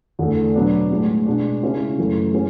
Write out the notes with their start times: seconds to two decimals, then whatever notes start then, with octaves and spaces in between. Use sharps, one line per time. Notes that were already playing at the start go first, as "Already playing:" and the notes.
0.19 E2 D3 A3
0.55 B2 F#3 B3 D4
0.91 A2 G#3 B3
1.26 B2 G#3 D4
1.63 C#3 G#3 C#4 E4
1.98 F#2 E3 A3
2.34 E3 G#3 C#4